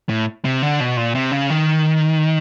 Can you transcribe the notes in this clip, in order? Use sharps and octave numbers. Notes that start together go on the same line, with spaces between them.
A2
C3
D3
B2
A#2
C3
C#3
D#3